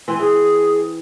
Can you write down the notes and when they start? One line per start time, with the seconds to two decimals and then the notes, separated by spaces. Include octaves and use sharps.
0.08 E3 C4 G5 G#5
0.19 E3 G#4